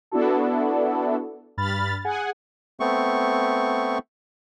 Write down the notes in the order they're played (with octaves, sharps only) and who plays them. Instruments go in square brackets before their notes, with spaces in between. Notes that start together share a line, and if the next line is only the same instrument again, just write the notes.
[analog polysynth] B3 D4 E4 F#4 A4
G2 B5 F6 A6
G#4 F#5 G#5
[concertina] A3 B3 C4 C#6